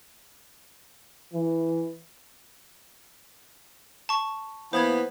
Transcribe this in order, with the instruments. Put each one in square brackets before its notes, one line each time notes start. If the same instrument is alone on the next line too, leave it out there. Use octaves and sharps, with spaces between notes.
[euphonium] E3
[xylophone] A5 C#6
[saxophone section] E3 A#3 B3 [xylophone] C5 G#6